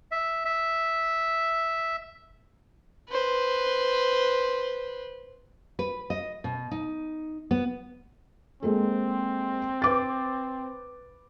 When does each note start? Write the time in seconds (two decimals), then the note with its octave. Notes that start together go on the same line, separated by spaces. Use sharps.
0.12 E5
0.45 E5
3.10 B4 C5
5.79 B4
6.10 D#5
6.44 B2
6.71 D#4
7.51 B3
8.63 G#3 A#3 C4 A4
9.82 B4 D6 A6